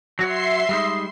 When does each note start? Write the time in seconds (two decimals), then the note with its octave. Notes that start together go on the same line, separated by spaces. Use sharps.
0.19 F#3 F#4 C#5 E5 C6 C7
0.69 G3 G#3 D#4